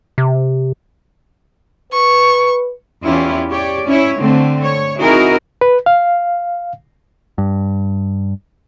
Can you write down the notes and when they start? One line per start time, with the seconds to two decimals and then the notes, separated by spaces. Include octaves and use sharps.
0.18 C3
1.93 B4 C#6
3.04 E2 C#4 E4 F4 G4
3.51 G4 C#5 D5
3.86 C#4 E4 C#5
4.19 D3 A3 C4
4.62 C#5
4.99 C4 D#4 E4 F#4 G#4 A#4
5.61 B4
5.86 F5
7.38 G2